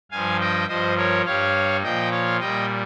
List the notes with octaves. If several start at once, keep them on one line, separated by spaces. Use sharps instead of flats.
G2 F3 F5 G#5
D#5 G5
G2 F3 C5 D#5
A#4 C#5
G2 G3 C#5 F5
A#2 F3 D#5 G5
C#5 F5
A#2 G3 D#5 G5